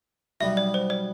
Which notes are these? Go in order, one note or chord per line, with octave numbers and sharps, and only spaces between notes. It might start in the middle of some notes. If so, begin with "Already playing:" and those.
B1 B2 G3 B3 E5
D5
C5
D5